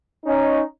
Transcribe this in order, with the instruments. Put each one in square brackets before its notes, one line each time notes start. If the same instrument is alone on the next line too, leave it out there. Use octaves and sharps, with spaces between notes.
[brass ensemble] C#4 D#4